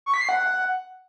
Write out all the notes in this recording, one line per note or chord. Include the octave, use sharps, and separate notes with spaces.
C#6
B6
C7
F#5